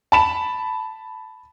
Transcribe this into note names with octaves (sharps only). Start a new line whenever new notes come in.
A5 B5 E7